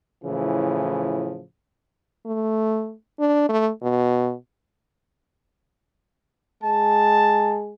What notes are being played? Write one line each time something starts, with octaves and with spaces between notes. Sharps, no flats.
A2 C#3 E3 F3
A3
D4
A3
B2
G#3 A5